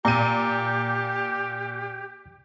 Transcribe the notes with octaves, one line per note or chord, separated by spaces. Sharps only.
A#2 G4 A#5 D#7